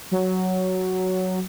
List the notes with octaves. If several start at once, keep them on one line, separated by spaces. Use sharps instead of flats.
F#3